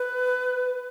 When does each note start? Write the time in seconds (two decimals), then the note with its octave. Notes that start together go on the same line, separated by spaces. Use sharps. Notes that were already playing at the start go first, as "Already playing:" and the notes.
Already playing: B4